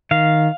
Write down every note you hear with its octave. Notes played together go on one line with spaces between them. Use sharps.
D#3 F5